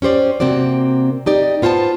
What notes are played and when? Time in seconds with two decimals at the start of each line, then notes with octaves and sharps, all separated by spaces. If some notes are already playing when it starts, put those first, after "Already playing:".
0.02 C#4 G4 C5 D5
0.40 C3 A#3 C4 F#4 D5
1.26 D#4 G4 D5
1.62 B3 F4 C5 G5 A5